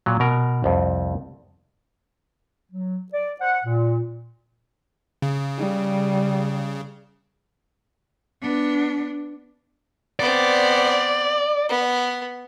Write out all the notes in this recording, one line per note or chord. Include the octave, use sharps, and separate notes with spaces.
A#2 F#3
B2 A#4
C2 F2
F#3
D5
C5 F#5
A#2
C#3
G3
B3 D4
B3 C4 D5
B3